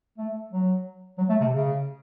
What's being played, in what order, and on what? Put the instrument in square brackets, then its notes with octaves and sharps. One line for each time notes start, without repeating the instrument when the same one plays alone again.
[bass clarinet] A3
F#3
F#3
A3
C3
C#3